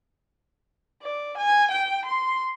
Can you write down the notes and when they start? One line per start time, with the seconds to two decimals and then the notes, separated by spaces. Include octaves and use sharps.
1.02 D5
1.38 G#5
1.71 G5
2.05 C6